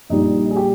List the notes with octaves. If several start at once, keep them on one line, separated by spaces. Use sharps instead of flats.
A#1 A#2 G3 D#4
G#4
G4